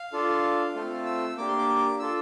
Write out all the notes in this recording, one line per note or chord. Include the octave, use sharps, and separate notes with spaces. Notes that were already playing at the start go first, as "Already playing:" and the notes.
Already playing: F5
D4 F4 A4
A3 C4 F4 A4
E6
A#3 D4 G4 D6
C6
D6
D4 F4 A4 E6